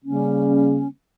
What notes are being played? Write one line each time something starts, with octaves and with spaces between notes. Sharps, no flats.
C#3 G3 A#3 C#4